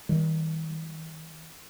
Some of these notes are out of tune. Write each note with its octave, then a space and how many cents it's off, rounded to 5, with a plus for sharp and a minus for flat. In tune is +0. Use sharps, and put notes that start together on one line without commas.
D#3 +45 G3 +0